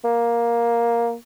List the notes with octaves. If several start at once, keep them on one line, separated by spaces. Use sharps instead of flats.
A#3